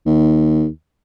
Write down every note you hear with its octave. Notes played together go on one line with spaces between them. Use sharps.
D#2